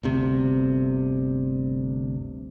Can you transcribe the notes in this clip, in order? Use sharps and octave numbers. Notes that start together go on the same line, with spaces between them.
G1 D2 C3